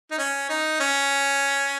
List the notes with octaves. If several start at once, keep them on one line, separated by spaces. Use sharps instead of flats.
D#4
C#4
D#4
C#4